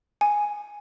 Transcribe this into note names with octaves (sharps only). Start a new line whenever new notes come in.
G#5